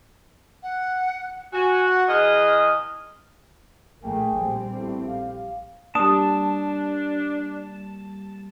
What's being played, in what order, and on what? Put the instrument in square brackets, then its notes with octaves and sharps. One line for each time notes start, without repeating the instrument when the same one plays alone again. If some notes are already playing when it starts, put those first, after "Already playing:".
[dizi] F#5
[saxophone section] F#4 [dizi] G#5
[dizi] F#5
[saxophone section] E2 G#4 D#5 [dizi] F6
[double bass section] A#1 A3 A#3 [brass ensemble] G#4 G5 G#5
[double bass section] A#1 G3 C4
[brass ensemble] A3 B3 E4
G4 F5
[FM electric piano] G3 A#3 [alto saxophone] D4 [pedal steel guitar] A5 [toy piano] D#6